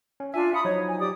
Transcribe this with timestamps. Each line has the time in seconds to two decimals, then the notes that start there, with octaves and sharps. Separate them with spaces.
0.20 C#4
0.34 D4 F4 E5 G#5
0.53 F4 B5 D#6 C#7
0.65 F3 F#3 D#4 C#5
0.87 G#5
1.00 G4 D5 D#6